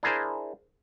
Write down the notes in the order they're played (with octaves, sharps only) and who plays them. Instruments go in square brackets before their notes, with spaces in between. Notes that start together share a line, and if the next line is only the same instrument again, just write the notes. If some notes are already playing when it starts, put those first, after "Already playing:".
[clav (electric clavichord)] D4 E4 G#4 A#4 C5